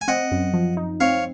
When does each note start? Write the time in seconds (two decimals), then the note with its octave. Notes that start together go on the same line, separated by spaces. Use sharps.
0.01 G#5
0.08 C4 D#5 F#5
0.31 F#2
0.54 F3
0.77 D#4
1.00 C4 C#5 F5